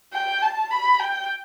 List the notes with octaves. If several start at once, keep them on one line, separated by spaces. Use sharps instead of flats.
G5
A5
B5
G5